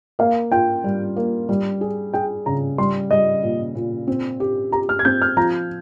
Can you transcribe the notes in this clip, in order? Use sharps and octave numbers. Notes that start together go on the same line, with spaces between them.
A#3 F5
F4 G5
G3
A#3
G3
G#4
G#4 G5
C#3 A#5
G3 C6
G3 D#5
A#2
A#2
C4
G4
G4 A#5
F6
G#6
C4 G6
F6
F3 A#5